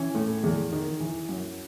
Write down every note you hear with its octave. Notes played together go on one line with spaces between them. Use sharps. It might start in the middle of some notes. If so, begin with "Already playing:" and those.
Already playing: E3 C#4
A2
E2
D#3
E3
F#2